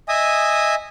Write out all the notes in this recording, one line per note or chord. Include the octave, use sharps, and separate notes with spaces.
D#5 E5 G#5 D#6